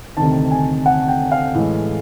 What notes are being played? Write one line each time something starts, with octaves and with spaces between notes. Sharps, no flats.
D2 C3 D#3 A5
G#5
F#5
G5
F5
A2 E3 G#3